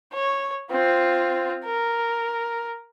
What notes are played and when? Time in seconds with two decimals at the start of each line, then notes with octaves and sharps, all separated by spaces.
0.13 C#5
0.71 C4 F4
1.65 A#4